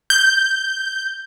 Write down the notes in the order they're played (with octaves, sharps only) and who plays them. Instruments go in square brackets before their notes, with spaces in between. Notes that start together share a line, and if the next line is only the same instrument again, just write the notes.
[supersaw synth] G6